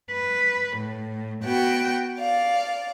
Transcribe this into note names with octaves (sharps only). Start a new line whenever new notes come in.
B4
A2
B3 F#4 F#5 G5
D5 F5